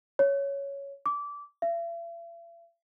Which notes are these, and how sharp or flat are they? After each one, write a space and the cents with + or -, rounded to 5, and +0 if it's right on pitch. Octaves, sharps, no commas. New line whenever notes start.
C#5 +5
D6 -20
E5 +45